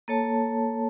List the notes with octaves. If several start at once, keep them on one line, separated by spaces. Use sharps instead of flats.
A#3 A4 C#5 A5